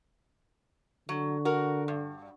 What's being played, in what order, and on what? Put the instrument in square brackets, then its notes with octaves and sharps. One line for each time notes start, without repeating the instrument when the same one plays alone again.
[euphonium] D3 [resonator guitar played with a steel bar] F#3
[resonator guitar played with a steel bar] F#4 A#4
G2